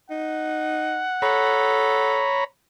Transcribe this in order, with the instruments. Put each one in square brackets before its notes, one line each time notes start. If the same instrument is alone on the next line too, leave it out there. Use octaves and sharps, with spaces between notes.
[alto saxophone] D#4 [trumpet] F#5
[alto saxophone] A4 [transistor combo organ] C#5 A#5 B5